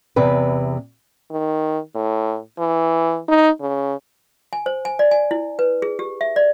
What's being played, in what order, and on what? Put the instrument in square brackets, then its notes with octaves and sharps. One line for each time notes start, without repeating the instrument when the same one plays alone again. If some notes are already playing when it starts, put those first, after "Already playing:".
[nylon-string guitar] E2 C3 B4
[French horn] D#3
A2
E3
D#4
C#3
[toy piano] G#5
C5
G#5
D5
G#5
E4
B4
G#4
G4
E5
D5